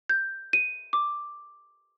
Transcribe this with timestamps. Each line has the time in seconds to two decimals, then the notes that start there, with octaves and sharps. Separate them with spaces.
0.09 G6
0.53 D#7
0.93 D6